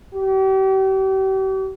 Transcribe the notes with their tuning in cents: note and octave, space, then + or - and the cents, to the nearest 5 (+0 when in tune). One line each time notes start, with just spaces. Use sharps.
G4 -40